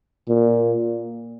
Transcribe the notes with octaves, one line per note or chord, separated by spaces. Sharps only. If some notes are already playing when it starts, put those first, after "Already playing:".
A#2